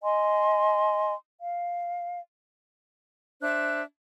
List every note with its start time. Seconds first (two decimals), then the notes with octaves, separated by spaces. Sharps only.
0.03 D#5 G#5 C6
1.40 F5
3.41 D4 C5 E5 F#6